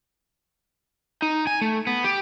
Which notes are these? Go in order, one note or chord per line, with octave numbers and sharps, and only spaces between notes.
D#4
G#5
A3
B3
G4